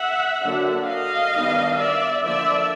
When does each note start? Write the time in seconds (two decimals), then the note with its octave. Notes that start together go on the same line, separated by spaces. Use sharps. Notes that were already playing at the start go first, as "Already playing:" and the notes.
Already playing: E5 F#5
0.41 D3 F#3 A#3 D4
0.87 D#5 F5
1.33 D#3 G3 B3 D4
1.78 D5 E5
2.23 D3 F3 A#3 D5 E5